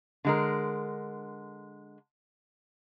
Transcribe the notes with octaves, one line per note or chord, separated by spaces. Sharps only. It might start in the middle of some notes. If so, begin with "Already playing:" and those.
D3 G#3 A#4